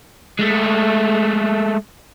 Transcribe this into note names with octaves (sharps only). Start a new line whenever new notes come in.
G#3 A3